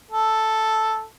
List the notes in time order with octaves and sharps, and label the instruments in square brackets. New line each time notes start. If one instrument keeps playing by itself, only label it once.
[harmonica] A4